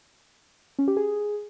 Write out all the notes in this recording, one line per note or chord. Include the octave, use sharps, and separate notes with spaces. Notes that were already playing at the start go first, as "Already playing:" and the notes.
C#4
G4
G#4